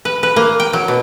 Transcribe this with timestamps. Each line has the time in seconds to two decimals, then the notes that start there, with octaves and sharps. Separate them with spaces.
0.05 B4
0.23 B4
0.36 A#3
0.60 G5
0.73 F#3
0.88 B2